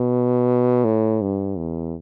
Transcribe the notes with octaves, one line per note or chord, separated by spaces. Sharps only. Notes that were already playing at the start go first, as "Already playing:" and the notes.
Already playing: B2
A2
G2
E2